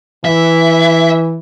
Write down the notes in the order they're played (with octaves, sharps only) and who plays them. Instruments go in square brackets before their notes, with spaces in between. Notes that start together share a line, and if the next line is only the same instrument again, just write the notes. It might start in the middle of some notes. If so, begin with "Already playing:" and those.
[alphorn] E3 [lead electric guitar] E5